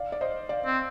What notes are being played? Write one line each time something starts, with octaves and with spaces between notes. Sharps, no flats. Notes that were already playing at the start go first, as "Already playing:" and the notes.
Already playing: D5 F5
D5
C5 D#5
D5 F5
C4